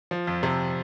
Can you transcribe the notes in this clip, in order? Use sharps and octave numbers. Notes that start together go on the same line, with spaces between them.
F3
F2
C3